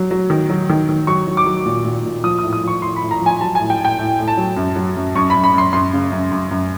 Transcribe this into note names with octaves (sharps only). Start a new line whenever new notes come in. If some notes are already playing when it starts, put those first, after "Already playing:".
Already playing: F#3
F#3
D#3
F#3
D#3
D#3
F#3 C#6
F#3
D6
F#3
A#2
A#2
A#2
F3 D#6
A2 D#6
D#6
F3 C#6
A2 C6
B5
A2
A#5
F3 G#5
F#3 A5
A2 G#5
G5
A2
G5
A2
A2
A5
F#3
F#2
F#3
F#2
F#2 C#6
B5
F#2
B5
F#2 C6
F#2 C6
C#3
F#2
F#2
F#2